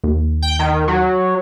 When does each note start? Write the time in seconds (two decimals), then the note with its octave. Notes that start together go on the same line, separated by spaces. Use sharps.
0.04 D#2
0.42 G5
0.59 D#3
0.88 F#3